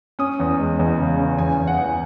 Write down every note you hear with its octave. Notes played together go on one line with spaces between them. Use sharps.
C#4 D#6
E2
G#3
E2
C#3
C#4
E2 G#5
E2
F#5
E2